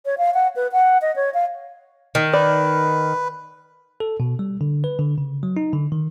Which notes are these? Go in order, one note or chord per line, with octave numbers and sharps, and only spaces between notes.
C#5
F5
F#5
B4
F#5
D#5
C#5
F5
D#3
B4 D5
A4
B2
G3
D3
B4
D3
C#3
F#3
D#4
D3
D#3